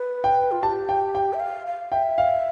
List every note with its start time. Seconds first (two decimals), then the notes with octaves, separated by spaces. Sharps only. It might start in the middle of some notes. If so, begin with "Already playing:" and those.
Already playing: B4
0.24 G5
0.51 F4
0.62 G4 A5
0.89 G5
1.15 G5
1.33 E5
1.40 F5
1.66 F5
1.92 E5 G5
2.18 F5